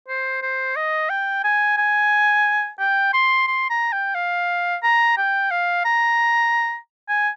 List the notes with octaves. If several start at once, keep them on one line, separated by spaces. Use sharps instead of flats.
C5
C5
D#5
G5
G#5
G#5
G5
C6
C6
A#5
G5
F5
A#5
G5
F5
A#5
G#5